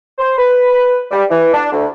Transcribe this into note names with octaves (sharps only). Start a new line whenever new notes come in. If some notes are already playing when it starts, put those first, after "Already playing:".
C5
B4
G3
E3
D4
D2